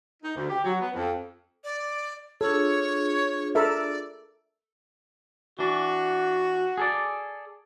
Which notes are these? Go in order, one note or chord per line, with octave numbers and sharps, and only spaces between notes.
D#4
D2
G4
F#3
B3
F2
D5
D4 F4 G#4 A4 C#5
A4 A#4 D5 E5
E3 D4 F#4
G#4 A4 D5